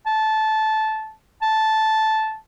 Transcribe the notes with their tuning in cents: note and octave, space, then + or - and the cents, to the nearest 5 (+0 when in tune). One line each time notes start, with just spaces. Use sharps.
A5 -15
A5 -10